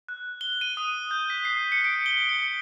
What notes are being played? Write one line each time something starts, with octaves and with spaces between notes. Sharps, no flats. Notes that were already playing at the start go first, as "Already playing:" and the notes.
F#6
G7
D#7
D#6
G6
B6
C7
C#7
D7
G7
C#7